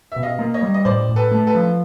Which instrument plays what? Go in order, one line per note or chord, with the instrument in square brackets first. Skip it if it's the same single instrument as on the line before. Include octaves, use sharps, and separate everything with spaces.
[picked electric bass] B2 [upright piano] E5
[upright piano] D#5 F5
[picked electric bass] A#3
[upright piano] C#5 D#5
[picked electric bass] G3
[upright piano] D#5
[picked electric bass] A2 [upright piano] C5 D5
[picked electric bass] A2
[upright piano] A4 B4
[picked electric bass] A3
[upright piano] A4 B4
[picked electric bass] F3